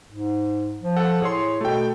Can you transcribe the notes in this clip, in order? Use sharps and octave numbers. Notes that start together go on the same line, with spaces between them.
G#2
F3
A4 F#5
A2 G#4 C#5 C6
B2 A3 G5